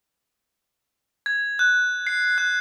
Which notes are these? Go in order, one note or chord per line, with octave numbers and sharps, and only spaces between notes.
G#6
F#6
C7
F#6